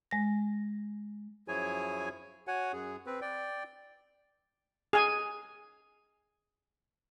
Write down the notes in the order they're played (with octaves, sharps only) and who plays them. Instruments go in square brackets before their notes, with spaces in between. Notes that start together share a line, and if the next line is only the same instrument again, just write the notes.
[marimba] G#3 A#6
[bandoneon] F#2 F3 E4 G#4 C#5 G#5
F#4 C#5 F#5 G#5
F#2 G#4
C4 B4
D5 G5
[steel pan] G#4 G#5